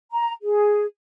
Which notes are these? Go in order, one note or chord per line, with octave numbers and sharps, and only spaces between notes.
A#5
G#4